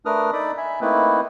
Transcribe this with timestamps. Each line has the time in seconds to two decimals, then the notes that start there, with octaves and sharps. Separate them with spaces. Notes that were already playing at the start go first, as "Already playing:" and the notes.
0.06 A3 D4 A#4 B4 D#6 F6
0.33 D#4 A4 D5 B5 D6
0.57 E5 G#5 B5
0.81 A3 A#3 C4 D#4 E4 B4